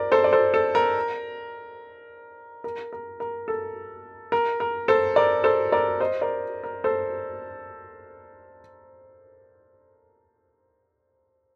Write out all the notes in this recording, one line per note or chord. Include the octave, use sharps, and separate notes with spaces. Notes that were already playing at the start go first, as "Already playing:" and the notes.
Already playing: A#4 C5 D5
A4 C5
D5
A4 C5
A4
A#4
A#4
A#4
A#4
A4
A#4
A#4
A4 C5
A#4 D5
A4 C5
A#4 D5
C5 D#5
A#4 D5
A#4
A4 C5